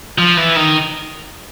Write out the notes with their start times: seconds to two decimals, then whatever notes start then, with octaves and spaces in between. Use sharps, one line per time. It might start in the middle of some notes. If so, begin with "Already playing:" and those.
0.19 F3
0.38 E3
0.56 D#3